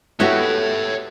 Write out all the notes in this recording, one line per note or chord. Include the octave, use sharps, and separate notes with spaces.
A3 B3 E4 F#4 G4 C#5 E5